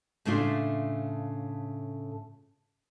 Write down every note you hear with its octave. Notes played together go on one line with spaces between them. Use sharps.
A2 C#3 A3 D4 F4